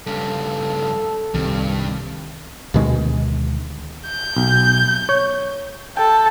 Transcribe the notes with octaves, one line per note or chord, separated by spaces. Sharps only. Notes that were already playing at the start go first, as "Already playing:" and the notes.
G2 C#3 A4
C2 G2 D#3 C4
D2 B2 D#3 G#3
G6
B1
C#5
A4 G5